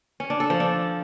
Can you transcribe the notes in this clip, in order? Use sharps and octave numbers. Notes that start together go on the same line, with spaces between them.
C#4
D4
A4
F3
D4